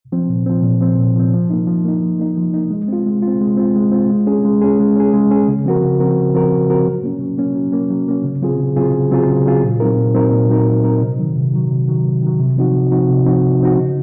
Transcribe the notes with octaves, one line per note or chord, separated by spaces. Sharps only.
F3 C4
A#2
F3 C4
A#2
F3 C4
A#2
F3 C4
F3
A#3 D#4
F3
A#3 D#4
F3
A#3 D#4
F3
A#3 D#4
G#3
C4 F4
G#3
C4 F4
G#3
C4 F4
G#3
C4 F4
G#3
C#4 G#4
G#3
C#4 G#4
G#3
C#4 G#4
G#3
C#4 G#4
C#3
F3 C4 F#4 A#4
C#3
F3 C4 F#4 A#4
C#3
F3 C4 F#4 A#4
C#3
F3 C4 F#4 A#4
F#3
A#3 C#4
F#3
A#3 C#4
F#3
A#3 C#4
F#3
A#3 C#4
C#3
F#3 C4 F4 G#4
C#3
F#3 C4 F4 G#4
C#3
F#3 C4 F4 G#4
C#3
F#3 C4 F4 G#4
A#2
F#3 C4 D#4 A#4
A#2
F#3 C4 D#4 A#4
A#2
F#3 C4 D#4 A#4
A#2
F#3 C4 D#4 A#4
C3
D#3 F#3
C3
D#3 F#3
C3
D#3 F#3
C3
D#3 F#3
C3
F3 C4 D#4 F#4
C3
F3 C4 D#4 F#4
C3
F3 C4 D#4 F#4
C3
F3 C4 D#4 F#4
C#3